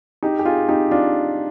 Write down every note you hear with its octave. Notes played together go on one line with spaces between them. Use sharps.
D#4 G4
G4
F4 G#4
D#4 G4
D4 F4